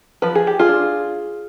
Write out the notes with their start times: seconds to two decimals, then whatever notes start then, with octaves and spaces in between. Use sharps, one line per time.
0.22 F3 B4
0.35 G#4
0.47 G4
0.59 F4 G#4
0.69 D4